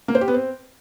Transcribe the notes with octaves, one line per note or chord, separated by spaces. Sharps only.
A#3
C5
G4
B3
C4